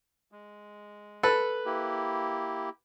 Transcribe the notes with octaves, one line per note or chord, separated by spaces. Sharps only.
G#3
A4 B4
A#3 E4 G4